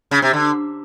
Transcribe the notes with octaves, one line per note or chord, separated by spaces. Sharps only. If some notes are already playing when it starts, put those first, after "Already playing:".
C#3
C3
D3